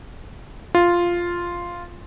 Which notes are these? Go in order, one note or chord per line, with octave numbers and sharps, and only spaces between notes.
F4